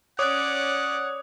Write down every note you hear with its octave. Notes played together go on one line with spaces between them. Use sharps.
C#4 C#5 D5 F#5 D6 D#6 F#6